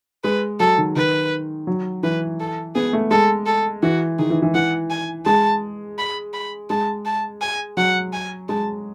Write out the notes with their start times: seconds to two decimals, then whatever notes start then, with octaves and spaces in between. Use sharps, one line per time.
0.24 G#3 B4
0.60 F#3 A4
0.78 D#3
0.96 D#3 B4
1.67 F#3
2.03 E3 B4
2.40 A4
2.75 B3 G#4
2.93 A3
3.11 G#3 A4
3.46 A4
3.83 E3 F#4
4.19 D#3 G#4
4.30 E3
4.42 E3
4.55 E3 F#5
4.90 G#5
5.25 G#3 A5
5.98 B5
6.33 B5
6.70 G#3 A5
7.05 A5
7.41 G#5
7.77 F#3 F#5
8.13 G#5
8.49 G#3 A5